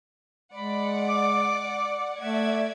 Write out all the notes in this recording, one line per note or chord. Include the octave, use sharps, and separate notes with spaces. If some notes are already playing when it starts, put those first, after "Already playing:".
G#3 D5 F#5 B5
D6
A3 D5 E5 F#5 G#6